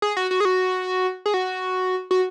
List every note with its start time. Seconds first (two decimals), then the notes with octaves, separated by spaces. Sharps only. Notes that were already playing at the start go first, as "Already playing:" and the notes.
0.02 G#4
0.17 F#4
0.31 F#4
0.40 G#4
0.45 F#4
1.26 G#4
1.34 F#4
2.11 F#4